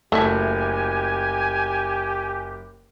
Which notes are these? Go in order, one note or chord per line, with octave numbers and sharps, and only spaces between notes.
F#1 A3 G4 A4 E5 G#5